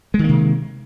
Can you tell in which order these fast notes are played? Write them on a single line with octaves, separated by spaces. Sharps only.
G#3 D#3 A#3 C3